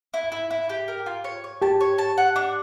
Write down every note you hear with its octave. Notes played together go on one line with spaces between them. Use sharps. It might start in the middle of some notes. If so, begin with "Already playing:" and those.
E4
E4
E4
G4
A#4
F4
C#5
C#5
G4 A5
C#5
A5
F#5
D4